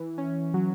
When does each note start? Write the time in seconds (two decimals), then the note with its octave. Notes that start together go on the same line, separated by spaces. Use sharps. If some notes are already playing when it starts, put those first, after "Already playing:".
Already playing: E3
0.18 C#4
0.54 F#3